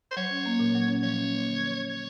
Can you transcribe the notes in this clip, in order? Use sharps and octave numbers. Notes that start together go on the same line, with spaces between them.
C5
F#3 C#5
C#4
A#3
A#2
F#3
C#4
F3 C#5
C#4
A#3
D3
F3
C#4
F#3 C#5